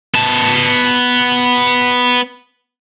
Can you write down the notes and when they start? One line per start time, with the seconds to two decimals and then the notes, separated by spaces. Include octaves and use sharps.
0.14 B3 A5